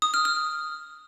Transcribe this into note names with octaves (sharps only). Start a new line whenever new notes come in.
D#6
F6
F6